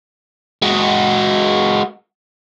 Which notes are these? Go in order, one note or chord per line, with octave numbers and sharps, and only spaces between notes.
G#3 F#4